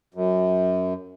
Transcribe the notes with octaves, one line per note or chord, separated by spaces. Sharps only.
F#2